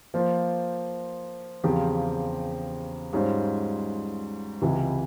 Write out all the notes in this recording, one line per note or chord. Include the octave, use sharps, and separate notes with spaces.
F3 A#3 F4 C5
E2 C#3 F3 C4 G4
G#2 G3 C#4 F4 C5
C#2 C3 E3